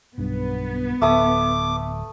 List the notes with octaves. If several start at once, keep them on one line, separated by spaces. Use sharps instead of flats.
B1 G2 B3
D1 A3 D6 D#6